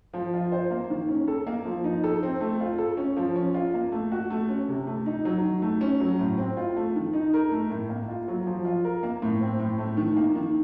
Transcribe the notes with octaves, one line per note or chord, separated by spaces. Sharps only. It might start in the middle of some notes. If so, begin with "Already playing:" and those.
F3
F4
C5
A#3
D#3
C#4
A4
A#3
F3
D#4
A4
C4
A3
F4
A4
C#4
F3
C#4
F4
A#3
A3
F#4
A3
C#4
C3
A3
D#4
F#3
D#3
A3
C#4
F#3
A2
C4
F4
A3
D#3
D#4
A#4
A3
A2
A#3
F4
F#3
F3
F4
A#4
A#3
A2
C4
A2
A3
D#3
A#3
D#3